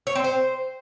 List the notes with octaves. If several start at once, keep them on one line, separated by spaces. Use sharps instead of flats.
C#5
C4
C5